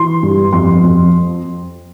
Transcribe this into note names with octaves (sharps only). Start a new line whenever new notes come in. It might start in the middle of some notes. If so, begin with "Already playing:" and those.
Already playing: E3 C6
G2
F2 C6
F2